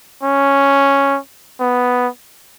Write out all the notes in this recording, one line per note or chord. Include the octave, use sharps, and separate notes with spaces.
C#4
B3